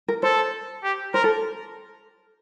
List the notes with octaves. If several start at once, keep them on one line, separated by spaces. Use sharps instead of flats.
A#4
A4 C5
G4
A#4 C5
A4